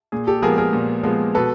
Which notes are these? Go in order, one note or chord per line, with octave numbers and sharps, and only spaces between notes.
A#2 G#4
G4 A4
F3 G#3 B3 G#4 A#4
G#4 A#4
A#2
F3 G#3 B3
B2 A4 B4